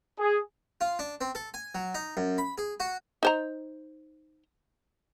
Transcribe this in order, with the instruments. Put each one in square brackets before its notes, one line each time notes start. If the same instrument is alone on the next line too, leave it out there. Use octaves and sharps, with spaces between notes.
[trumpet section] G#4
[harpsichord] F4
D4
C4
A4
G#5
F#3
D#4
F#2
B5
G#4
F#4
[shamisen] D#4 C5 A#5